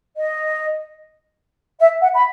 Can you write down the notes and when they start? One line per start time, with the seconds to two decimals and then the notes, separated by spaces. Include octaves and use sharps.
0.16 D#5
1.80 E5
2.01 F#5
2.14 B5